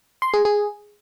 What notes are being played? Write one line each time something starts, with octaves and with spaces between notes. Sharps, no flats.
C6
G#4
G#4